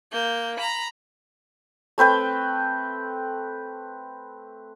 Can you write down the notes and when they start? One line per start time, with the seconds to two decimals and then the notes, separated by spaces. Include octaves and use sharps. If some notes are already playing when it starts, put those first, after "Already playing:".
0.12 A#3 G6
0.57 A#5 B5
1.98 A3 C4 B4 G5